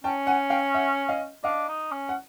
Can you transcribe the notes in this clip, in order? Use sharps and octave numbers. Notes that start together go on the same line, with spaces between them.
C#4 G5 A5
F#5 G#5
F5 G5
E5 F#5
D#5 F5
D4 D#5 F5
D#4
C#4
F#5